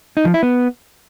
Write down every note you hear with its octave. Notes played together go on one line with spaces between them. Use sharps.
D#4
F3
E4
B3